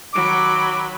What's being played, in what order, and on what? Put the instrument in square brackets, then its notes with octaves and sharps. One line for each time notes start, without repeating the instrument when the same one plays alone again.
[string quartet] D#3 F#3 B5 [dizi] D6